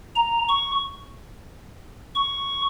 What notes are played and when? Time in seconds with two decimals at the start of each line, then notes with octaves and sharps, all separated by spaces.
0.16 A#5
0.49 C#6
2.15 C#6